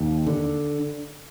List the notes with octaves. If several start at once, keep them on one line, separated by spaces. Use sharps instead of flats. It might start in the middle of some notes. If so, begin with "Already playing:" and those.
Already playing: D#2
D3